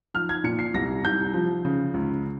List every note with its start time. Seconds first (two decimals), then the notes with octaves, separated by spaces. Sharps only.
0.14 F3 F6
0.29 G#6
0.44 A#2 C#7
0.59 C7
0.74 C2 A#6
1.04 C2 G6
1.34 F3
1.65 C#3
1.94 C#2